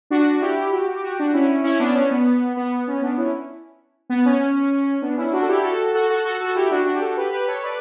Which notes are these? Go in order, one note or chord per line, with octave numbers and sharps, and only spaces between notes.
D4 F#4
F#4
E4 G4
F#4
G4
F#4
G4
F#4
G4
D4 F#4
C#4 E4
C#4 E4
B3 D4
C#4
B3
B3
C#4
B3 D4
C#4 E4
B3
C#4
B3 D4
C#4 E4
D4 F#4
A4
E4 G4
F#4 A4
F#4 A4
F#4 A4
F#4 A4
F#4 A4
E4 G4
D4 F#4
D4 F#4
G4
F#4 A4
G4 B4
G4 B4
A4 C#5
B4 D5